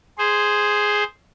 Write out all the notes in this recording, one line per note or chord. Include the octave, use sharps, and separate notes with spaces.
G#4 C5